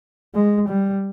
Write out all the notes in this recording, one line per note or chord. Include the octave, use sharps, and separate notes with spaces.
G#3
G3